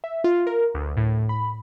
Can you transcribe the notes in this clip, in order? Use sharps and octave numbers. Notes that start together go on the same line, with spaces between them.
E5
F4
A#4
D2
A2
B5